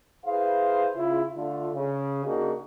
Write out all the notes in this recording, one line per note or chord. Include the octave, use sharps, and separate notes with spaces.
E4 G#4 B4 C5 F5
C#3 E4 F4
D3 A3 F4
C#3
C#3 A#3 D4 D#4 F#4 G#4